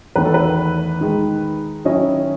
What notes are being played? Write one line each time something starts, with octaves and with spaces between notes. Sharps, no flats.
E2 D#3 A3 B4
A4
B4
D#3 G#3 D#4
D#3 F#3 C#4 E4 D#5